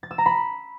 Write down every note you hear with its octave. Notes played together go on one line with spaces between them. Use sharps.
A6
E6
A#5
B5